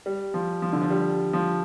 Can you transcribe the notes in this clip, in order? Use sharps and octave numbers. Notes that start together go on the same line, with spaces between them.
G3
F3
F3
D3
F3
G3
F3